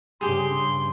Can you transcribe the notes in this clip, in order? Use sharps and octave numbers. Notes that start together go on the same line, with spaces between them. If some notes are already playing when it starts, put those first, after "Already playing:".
G2 C#3 G4 G#4 C6